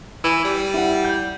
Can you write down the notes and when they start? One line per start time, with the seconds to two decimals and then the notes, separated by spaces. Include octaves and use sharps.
0.24 E3 E6
0.44 G3
0.74 E4 F#5
1.04 G6